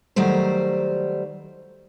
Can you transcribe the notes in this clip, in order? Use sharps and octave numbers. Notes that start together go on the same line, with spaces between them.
D#3 F#3 G3 A3 C5